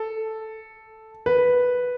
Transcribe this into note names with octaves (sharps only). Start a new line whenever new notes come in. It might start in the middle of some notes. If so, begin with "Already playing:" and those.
Already playing: A4
B4